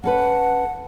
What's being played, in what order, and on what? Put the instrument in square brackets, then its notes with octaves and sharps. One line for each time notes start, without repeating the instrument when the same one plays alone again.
[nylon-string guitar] C#4 A4 B4 [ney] F#5